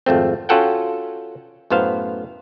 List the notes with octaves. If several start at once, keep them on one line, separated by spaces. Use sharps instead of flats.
G#1 F2 A3 C4
C#4 F4 F#4 A4 F#5 G5
F#2 A2 B3 C5 F5